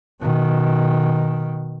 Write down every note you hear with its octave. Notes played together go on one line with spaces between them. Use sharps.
B2 D#3